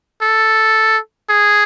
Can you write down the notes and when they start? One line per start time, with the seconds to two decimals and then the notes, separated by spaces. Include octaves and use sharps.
0.22 A4
1.29 G#4